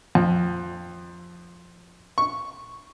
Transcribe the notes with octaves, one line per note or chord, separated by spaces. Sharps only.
F2
C#6